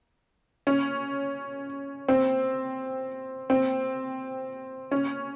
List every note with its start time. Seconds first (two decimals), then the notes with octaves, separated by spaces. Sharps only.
0.67 C#4
2.08 C4
3.50 C4
4.91 C#4